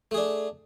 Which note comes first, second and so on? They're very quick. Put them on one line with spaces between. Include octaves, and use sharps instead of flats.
A3 G#4 D4